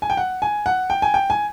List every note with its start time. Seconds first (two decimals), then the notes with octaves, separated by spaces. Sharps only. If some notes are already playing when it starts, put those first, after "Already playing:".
0.02 G#5
0.10 G5
0.17 F#5
0.42 G#5
0.66 F#5
0.90 G5
1.02 G#5
1.14 G5
1.30 G#5